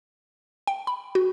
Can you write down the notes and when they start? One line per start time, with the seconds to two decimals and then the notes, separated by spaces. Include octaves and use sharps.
0.67 G5
0.87 B5
1.15 F#4